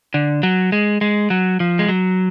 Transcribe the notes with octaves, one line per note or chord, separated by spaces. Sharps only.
D3
F#3
G#3
G#3
F#3
F3
G#3
F#3